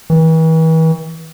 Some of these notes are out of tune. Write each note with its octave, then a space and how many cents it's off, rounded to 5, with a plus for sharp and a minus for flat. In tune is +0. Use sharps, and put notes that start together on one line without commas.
E3 -40